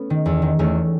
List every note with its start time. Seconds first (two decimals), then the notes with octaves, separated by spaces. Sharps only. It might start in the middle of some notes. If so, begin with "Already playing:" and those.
Already playing: A3 B3 C#4
0.10 D#3
0.26 E2
0.42 D#3
0.59 E2 A3 C#4